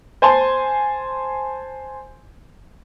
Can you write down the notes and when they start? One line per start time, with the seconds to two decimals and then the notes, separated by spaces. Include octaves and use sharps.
0.22 C5 G#5 A5 C6